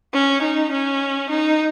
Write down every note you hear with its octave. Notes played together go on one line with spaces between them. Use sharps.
C#4
D#4
C#4
D#4